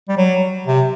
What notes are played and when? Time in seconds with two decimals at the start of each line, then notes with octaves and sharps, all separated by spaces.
0.09 G3
0.17 F#3
0.67 C3